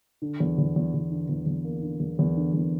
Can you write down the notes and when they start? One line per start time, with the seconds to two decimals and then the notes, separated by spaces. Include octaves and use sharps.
0.22 D3
0.40 E2
0.58 E2
0.76 E2
0.94 E2
1.11 D3
1.29 E2
1.46 E2
1.64 A#3
1.82 D3
2.00 E2
2.19 E2
2.37 D3
2.54 E2